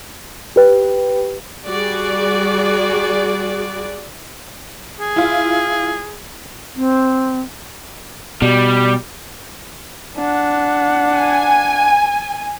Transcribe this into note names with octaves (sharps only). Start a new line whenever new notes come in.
G4 B4 G5
G3 F#4 G#4 D5
G#4
E4 F4
C4
B2 G3
D4 F#5
G#5